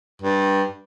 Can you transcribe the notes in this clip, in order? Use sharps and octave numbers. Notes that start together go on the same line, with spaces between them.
G2